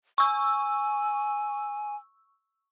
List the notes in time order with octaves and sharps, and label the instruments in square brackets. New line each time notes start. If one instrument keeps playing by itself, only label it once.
[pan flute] G#5 [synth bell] C#6 E6